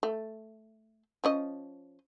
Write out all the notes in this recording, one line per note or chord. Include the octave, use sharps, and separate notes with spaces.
A3
F3 C#4 D#5